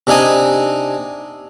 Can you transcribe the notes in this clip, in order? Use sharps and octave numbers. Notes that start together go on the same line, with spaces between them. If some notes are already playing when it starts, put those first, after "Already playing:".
C3 D4 D#4 G#5 D#6